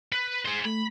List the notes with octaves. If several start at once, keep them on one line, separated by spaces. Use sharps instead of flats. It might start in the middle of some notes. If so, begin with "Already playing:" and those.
B4
G#4 C5
A3 B5